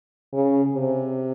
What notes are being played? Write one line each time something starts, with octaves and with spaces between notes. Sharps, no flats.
C#3
C3